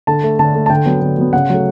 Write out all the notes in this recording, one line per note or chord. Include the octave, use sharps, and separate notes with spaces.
D3 A5
A3
D3 A5
A3
A5
D3 G5
F#3 B3
D3
F#3 B3
C#3 F#5
F#3 A3